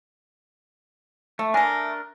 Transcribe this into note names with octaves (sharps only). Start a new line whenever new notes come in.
A3 E5
A3 D4 A#4 G#5